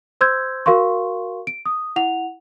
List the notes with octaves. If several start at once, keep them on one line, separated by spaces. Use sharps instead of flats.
C5 C6 E6 G6 G#6
F#4 A#4 F5 C6 C#6
D7
D#6
E4 F#5 F7